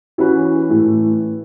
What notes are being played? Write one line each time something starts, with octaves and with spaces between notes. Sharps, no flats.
E3 C#4 F#4 B4
A2 E3 A3